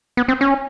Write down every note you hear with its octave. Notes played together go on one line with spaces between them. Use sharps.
B3
C4
C#4